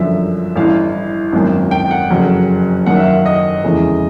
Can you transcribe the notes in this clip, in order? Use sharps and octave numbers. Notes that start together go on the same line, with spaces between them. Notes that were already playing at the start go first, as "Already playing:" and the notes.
Already playing: G1 F#2 D3 F3 E5
A1 G2 E3 F5
G#1 F#2 D#3
G5
F#5
F#1 F2 C#3 F#3
F#1 F#2 D#3 F#5
E5
F5
D#5
F1 E2 C#3 E3 G#3